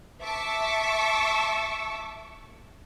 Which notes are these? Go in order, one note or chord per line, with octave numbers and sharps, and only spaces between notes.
E5 A5 C#6 D6 E6